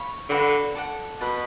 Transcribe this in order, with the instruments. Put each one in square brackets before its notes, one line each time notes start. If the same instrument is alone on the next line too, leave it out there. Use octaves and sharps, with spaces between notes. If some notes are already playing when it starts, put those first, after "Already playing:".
Already playing: [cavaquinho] C#5 F5 B5
[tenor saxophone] D3 [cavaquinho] F#4 B4 F5
[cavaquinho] A4 D5 F#5
[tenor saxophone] B2 [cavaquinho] B4 F#5 A5